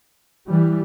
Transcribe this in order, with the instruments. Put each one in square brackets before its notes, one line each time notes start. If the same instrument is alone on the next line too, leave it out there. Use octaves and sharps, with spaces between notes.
[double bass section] E3 G3